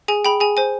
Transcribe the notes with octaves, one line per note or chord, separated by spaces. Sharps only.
G#4 G#5
G#4 G5 B5
G#4 G#5
C5 G#5